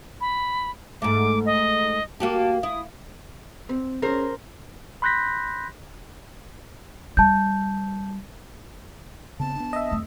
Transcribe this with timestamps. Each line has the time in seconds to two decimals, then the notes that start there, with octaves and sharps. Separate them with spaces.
0.21 B5
1.02 G#2 A3 D6
1.46 D#5
2.20 A#3 F#4 G4 A5
2.63 E4 D#6
3.69 C4
4.02 C#4 G#4 A#4 C5
5.02 B5 C6 F#6 G6 A#6 B6
7.17 G3 A5 G6
9.40 C#3 B3 C4 A5
9.56 B3 D4
9.73 D#5 E5
9.91 F2 A3